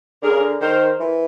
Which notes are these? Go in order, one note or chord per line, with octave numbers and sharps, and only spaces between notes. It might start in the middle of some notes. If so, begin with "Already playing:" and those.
D3 G#4 A#4
C#3
D3
D#3 A#4 C5
E3